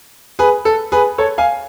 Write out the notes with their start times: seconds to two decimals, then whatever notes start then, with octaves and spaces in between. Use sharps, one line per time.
0.39 G#4 B4
0.65 A4
0.92 G#4 B4
1.18 A4 C#5
1.38 F5 G#5